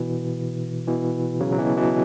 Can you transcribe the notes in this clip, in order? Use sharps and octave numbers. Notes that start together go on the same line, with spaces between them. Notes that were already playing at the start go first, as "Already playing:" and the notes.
Already playing: B2 E3
B2 E3
C#3 F#3
F#3
B2 E3
B2 E3